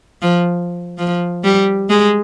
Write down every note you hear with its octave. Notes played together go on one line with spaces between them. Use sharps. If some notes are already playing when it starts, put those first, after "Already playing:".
F3
F3
G3
G#3